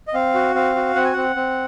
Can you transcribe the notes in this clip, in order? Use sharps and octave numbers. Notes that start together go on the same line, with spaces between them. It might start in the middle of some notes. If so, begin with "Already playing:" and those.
D#5
C4 F5
F#4
C4 F5
F#4
C4 F#5
G#5
C4 F#5
C4